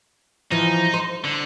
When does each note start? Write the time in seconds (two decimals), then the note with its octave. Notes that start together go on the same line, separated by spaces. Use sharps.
0.52 E3 F3 D#4
0.94 C5
1.24 D3